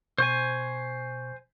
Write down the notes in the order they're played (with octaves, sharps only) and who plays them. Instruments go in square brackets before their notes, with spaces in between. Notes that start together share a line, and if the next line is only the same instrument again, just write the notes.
[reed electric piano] B2 C#6 [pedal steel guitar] C5 G#5